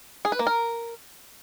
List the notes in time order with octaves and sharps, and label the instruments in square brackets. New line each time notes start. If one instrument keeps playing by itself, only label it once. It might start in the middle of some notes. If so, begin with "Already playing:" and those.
[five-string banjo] G#4
B4
A#3
A#4